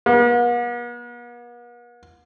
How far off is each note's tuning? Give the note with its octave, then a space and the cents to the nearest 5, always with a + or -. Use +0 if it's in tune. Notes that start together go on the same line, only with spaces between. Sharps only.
B3 -45